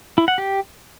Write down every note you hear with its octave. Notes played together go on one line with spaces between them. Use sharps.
E4
F#5
G4